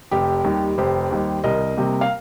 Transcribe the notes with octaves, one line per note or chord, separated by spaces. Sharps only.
F1 G4
D#2 D#3 G3
F1 G4 C5
D#2 D#3 G3
C2 A#4 D#5
C3 G3 A#3
F5